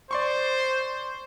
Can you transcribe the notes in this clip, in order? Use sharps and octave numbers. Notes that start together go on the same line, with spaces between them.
C5 D5 C6 C#6